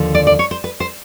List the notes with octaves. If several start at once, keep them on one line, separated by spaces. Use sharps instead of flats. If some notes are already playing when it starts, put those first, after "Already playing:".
Already playing: D#2 D3 F3
D5
D5
C#5
C5
B4
C5